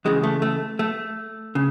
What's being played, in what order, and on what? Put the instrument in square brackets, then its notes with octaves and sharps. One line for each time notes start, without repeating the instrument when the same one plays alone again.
[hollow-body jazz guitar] C#2 C#3 E3 G#3
A3
A3
A3
C#3